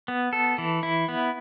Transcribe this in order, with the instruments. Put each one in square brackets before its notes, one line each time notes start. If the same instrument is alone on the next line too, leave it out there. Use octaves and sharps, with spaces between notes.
[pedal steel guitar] B3
A4
E3
E4
B3